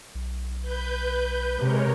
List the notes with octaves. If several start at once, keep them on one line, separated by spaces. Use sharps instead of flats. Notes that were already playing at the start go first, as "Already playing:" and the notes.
B1
B4 G6
C3 G#3 A#4 C#5